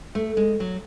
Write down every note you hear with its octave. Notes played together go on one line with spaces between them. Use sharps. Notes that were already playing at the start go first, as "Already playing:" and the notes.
A3
G#3
F#3